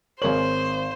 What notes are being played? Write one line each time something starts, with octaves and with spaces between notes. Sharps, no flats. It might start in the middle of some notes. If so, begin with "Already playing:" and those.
G#1 G#4 A#4 C5 C#5 F#7